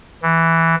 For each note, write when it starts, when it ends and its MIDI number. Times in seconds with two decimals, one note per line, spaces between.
0.22 0.75 52